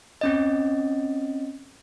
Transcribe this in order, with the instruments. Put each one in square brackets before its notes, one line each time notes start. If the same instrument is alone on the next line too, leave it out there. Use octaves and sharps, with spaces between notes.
[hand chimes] C4 C#4 D#5